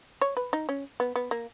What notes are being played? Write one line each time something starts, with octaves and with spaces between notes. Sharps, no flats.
C#5
B4
D#4
C#4
B3
B3
A#3